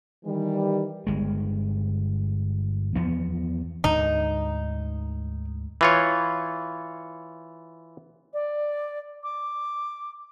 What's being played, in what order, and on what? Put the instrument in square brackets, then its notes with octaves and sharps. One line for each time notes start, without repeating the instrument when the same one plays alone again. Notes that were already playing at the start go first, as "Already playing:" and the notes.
[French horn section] D#3 E3 G3
[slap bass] G1 G#3
E2 F3 B3
[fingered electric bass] D2 G#2 D3 [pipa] D#4
[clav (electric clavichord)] E3 F4 C#5
[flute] D5
D6